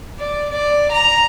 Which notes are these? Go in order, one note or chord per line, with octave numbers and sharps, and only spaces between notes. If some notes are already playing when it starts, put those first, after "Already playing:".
D5
D5
A#5